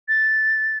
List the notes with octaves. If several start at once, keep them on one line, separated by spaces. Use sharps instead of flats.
A6